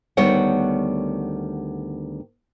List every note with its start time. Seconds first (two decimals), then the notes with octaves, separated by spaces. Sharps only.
0.17 D2 D#3 G3 B3 C#5 F#5